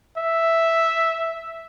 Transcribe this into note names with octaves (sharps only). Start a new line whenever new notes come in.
E5